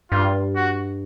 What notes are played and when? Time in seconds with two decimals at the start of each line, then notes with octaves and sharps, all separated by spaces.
0.11 G2 F4
0.56 F#4